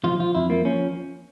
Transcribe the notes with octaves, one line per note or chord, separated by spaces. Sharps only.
F3 F4
F3 F4
F2 E4
F3 A#3
F3 C#4